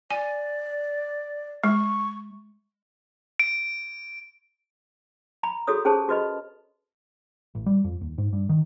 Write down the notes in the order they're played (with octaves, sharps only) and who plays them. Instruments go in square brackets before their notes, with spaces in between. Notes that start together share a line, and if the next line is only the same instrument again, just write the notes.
[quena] D5 [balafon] G#5
[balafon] G#3 [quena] C#6
[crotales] D7
[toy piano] A#5 B5
F#4 G#4 A4 C#5 D#6
C#4 G4 G#4 C5 C#5 A5
C#4 F#4 B4 D#5 B5
[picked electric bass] A1
G3
F2
D#2
G#2
G2
D#3